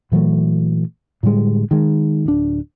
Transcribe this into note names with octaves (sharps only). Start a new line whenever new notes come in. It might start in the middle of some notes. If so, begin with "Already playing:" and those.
A#2 E3 F#3 A3
A2 D3 G3 G#3
D#3 G#3
D1 D4